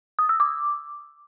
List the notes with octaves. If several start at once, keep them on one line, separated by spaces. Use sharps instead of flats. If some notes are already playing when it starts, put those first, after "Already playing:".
D#6
E6
D6